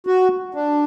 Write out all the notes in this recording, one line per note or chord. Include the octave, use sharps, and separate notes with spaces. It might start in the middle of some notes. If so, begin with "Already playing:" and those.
F#4
D4